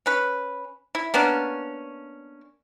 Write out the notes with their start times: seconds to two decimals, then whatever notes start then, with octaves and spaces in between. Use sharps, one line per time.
0.06 C#4 B4
0.95 E4
1.14 A#3 B3 C#4 D4